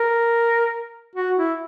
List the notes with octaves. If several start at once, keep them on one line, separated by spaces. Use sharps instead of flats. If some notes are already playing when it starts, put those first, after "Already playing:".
Already playing: A#4
F#4
E4